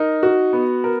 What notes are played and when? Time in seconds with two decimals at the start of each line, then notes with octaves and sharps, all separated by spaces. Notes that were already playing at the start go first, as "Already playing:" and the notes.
Already playing: D#4 A#4
0.23 F#4
0.53 B3
0.84 A#4